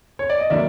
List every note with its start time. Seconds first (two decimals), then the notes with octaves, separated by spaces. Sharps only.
0.19 C#5
0.30 D5
0.40 D#5
0.50 D#3 F#3 A#3 D5 E5